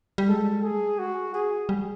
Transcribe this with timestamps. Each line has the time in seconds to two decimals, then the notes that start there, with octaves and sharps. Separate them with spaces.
0.18 G3
0.29 G#3 A4
0.64 G#4
0.99 F#4
1.34 G#4
1.69 G3